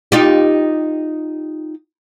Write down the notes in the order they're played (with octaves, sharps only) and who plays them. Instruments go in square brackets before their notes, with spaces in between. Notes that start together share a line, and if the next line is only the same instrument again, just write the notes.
[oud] D#4 F4 G4